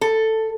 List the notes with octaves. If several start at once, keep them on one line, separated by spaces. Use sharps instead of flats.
A4